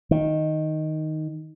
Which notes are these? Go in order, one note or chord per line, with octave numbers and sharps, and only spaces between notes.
D#3